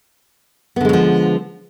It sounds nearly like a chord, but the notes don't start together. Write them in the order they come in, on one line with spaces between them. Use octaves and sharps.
B3 D3 G#3 F#3 F3